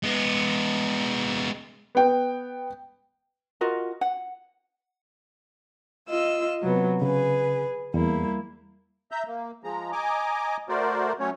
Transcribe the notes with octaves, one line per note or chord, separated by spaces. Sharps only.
G#3 B3
B3 G5
F4 F#4 A#4 D#5
F#5
F4 D#5 E6
C3 F#3 B3
C#3 G#4 B4
E2 G3 A#3 E4
E5 A#5 G6
A#3
F3 G#3 A#5
D#5 G#5 A#5 D6
A3 F#4 A#4 C5 D5
F#3 A3 C#4 C#5